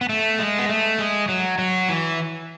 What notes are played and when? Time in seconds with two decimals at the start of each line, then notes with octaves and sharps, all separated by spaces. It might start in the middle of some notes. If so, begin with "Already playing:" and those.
0.01 B3
0.09 A3
0.39 G#3
0.59 B3
0.69 A3
0.99 G#3
1.29 F#3
1.58 F#3
1.89 E3